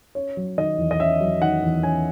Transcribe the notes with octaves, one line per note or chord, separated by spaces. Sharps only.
C#4 C#5
F#3
D#3 D#5
E2
D#5
C#4 E5
F#3
D#3 F#5
E2
C#4 G#5